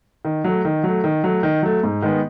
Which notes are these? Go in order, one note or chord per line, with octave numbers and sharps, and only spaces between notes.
D#3
F#3 A3
D#3
F#3 A3
D#3
F#3 A3
D#3
F#3 A3
G#2
D#3 G#3 B3